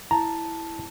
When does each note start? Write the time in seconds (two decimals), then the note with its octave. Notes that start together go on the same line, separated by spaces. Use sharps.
0.11 E4 A5 A#5